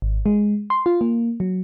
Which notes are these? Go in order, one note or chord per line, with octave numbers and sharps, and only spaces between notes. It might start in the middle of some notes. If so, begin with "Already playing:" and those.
G#1
G#3
C6
F4
A#3
F#3